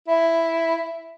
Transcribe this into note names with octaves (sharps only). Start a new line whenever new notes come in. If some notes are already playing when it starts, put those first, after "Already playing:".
E4